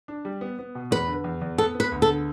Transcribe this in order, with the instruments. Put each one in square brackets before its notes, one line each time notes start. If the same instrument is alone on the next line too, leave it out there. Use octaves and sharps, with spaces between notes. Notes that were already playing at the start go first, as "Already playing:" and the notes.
[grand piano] D4
G3
B3
B3
B2
[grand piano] E2 [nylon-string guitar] B4
[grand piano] D3
E2
E2
[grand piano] B3 [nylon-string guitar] A4
[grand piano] B3
[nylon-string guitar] B4
[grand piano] D2
[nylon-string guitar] A4
[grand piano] D3